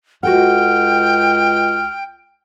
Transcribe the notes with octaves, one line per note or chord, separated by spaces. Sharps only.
C#2 F#4 A4 F#5 G5 F6